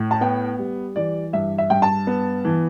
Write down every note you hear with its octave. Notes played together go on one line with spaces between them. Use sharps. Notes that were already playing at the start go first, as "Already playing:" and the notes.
Already playing: A2
A5
B3 G5
G3
E3 D5
G2 E5
E5
G2 G5
A5
B3
E3